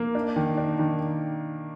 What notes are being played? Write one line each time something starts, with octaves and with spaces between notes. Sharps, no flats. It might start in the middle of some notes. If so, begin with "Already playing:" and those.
Already playing: A#3
D4
D#3
D4
D#3